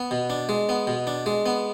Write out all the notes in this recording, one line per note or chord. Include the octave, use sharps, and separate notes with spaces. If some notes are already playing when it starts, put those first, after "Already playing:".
Already playing: B3
B2
D4
G#3
B3
B2
D4
G#3
B3